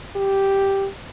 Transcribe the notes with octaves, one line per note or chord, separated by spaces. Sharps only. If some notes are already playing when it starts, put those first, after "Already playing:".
G4